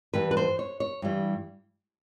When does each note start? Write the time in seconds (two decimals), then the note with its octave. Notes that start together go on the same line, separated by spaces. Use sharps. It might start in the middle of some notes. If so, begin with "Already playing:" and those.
0.14 G2 E3 G3 B4
0.31 B4
0.37 C5
0.59 C#5
0.80 C#5
1.02 G2 E3 G3